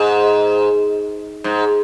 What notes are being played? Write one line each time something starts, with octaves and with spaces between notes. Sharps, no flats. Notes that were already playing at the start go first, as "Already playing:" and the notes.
Already playing: G#2
G#2